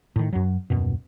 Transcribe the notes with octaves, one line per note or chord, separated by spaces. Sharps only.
A2 D#3
F#2 F#3
D#1 F#2 B2